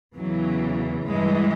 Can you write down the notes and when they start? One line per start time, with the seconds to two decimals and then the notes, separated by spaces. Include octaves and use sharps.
0.17 E2 C#3 E3 F#3
1.07 G2 E3 G#3